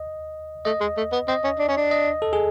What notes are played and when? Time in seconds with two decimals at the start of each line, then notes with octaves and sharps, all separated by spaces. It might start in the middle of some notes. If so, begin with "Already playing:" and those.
Already playing: D#5
0.65 A3 D#5
0.81 G#3
0.97 A3
1.13 B3
1.28 C4 D#5
1.44 C#4
1.59 D4
1.68 C#4
1.77 D4
1.91 D#5
2.22 A4
2.33 G#4